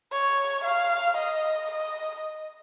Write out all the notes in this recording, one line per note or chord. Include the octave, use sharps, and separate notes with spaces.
C#5
F5
D#5
D#5